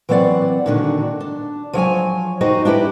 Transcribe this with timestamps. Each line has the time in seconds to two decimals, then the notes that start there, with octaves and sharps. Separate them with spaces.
0.09 E3 F#3 C4 C5 D5 F#5
0.66 A#2 D3 D#3 D4 F#4
1.21 D4
1.73 F3 F#3 C#5 G#5
2.41 D#4 F#4 G4 C5 D#5
2.65 D4 E4 G4 B4